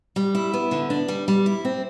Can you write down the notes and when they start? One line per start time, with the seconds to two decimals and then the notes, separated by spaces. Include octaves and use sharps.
0.16 G3
0.35 E4
0.54 B3
0.71 D3
0.90 D4
1.08 G3
1.28 G3
1.46 E4
1.65 C4